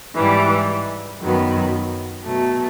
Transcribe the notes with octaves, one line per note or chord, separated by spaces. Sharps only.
G#2 E3 G3
F#2 D#3 F#3 B3
B2 F#3 A3